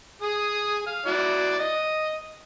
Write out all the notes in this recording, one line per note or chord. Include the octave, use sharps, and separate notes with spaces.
G#4 D#6
F5
E4 F#4 D5
D#5